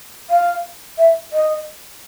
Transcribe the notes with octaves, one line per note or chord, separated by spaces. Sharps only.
F5
E5
D#5